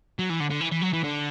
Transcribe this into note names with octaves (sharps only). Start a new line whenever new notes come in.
F#3
E3
D3
D3
E3
E3
F#3
E3
D3